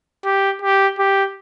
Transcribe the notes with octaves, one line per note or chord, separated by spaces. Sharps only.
G4
G4
G4